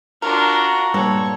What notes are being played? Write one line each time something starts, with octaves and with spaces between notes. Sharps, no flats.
D4 F4 F#4 A#4 A#5
G2 A#2 A4 C#5